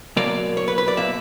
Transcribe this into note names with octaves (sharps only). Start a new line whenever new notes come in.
B2 F#3 A#3 D5
C#5
B4
B4
D5
B2 A#3 E5